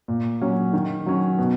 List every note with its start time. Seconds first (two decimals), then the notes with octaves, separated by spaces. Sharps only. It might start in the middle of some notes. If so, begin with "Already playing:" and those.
0.08 A#2
0.41 F#3 C#4
0.73 D#3
1.07 F#3 C#4
1.38 B2